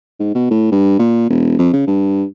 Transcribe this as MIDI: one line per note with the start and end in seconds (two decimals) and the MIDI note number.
0.20 0.31 44
0.35 0.47 47
0.51 0.67 45
0.72 0.97 43
0.99 1.27 46
1.29 1.55 28
1.59 1.69 41
1.73 1.84 49
1.87 2.24 43